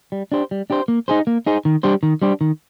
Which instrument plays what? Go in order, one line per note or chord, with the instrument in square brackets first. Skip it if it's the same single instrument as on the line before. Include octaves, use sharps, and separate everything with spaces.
[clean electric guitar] G3
D4 G4 C5
G3
D4 G4 C5
A#3
D#4 G#4 C5
A#3
D#4 G#4 C5
D#3
G3 D4 G4 C5
D#3
G3 D4 G4 C5
D#3